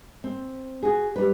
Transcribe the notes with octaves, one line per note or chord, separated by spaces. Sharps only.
C4
F#4 G#4
G3 B4